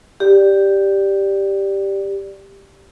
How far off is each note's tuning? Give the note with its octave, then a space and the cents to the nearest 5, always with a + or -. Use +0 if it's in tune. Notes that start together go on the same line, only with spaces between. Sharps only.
G4 +0 D5 +0